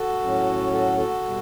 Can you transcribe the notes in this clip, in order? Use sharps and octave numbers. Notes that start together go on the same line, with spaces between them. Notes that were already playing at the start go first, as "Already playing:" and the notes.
Already playing: F#4 A4
A2 F#3 C#4
F#4 A4
F#4 A4
B2 G3